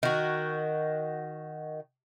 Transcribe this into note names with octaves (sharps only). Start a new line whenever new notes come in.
D#3 F#4